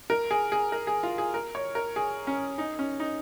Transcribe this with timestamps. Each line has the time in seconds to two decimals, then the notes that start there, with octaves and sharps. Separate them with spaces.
0.10 A#4
0.31 G#4
0.52 G#4
0.72 A#4
0.87 G#4
1.03 F4
1.18 G#4
1.34 A#4
1.55 C#5
1.75 A#4
1.96 G#4
2.27 C#4
2.58 D#4
2.79 C#4
3.00 D#4